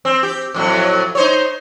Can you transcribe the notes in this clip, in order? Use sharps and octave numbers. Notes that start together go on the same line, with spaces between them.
C4
G4
F2 A2 F#3
D#4 C5 C#5